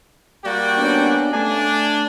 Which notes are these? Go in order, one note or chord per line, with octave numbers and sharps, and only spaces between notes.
G3 A#3 F#4 D5 G5
B3 C#4 D4
A3 D4 G#5